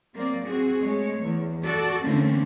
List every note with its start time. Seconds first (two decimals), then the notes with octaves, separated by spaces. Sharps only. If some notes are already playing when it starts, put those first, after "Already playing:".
0.14 F#3 A#3 C4 D5
0.46 C4 F#4 G#4
0.81 G#3 A3 C#5
1.23 E2
1.64 F#4 A4 D5
2.04 D3 E3 A3 A#3 C4 C#4